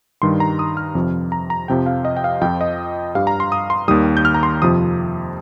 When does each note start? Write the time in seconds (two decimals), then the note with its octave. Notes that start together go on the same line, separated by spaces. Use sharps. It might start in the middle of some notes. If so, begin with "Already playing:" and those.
0.22 G2 D#3 G3 C6
0.40 A#5
0.59 D#6
0.77 F6
0.95 F2 C3 F3
1.32 A#5
1.50 A#5
1.68 F2 C3 F3 G5
1.86 F5
2.05 D#5
2.17 G5
2.24 F5
2.41 F2 F3 G5
2.61 D#5
3.15 G2 G3 F5
3.27 A#5
3.40 C6
3.52 D#6
3.70 C6
3.88 D#2 D#3 G3 D#6
4.17 G6
4.25 F6
4.34 A#5
4.43 C6
4.62 F2 C3 F3 D#6